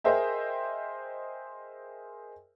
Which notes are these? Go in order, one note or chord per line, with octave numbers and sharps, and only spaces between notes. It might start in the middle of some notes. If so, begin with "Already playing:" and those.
G#4 A#4 C5 D#5 E5 G5